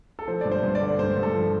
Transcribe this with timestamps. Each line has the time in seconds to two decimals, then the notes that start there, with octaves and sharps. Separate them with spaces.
0.19 A4
0.28 F3 C5
0.41 G2 D5
0.52 C5
0.63 G2
0.75 D5
0.82 D3
0.99 G2 C5
1.17 G2
1.23 A4
1.35 F3